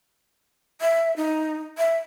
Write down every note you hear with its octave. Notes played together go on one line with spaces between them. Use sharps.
E5
D#4
E5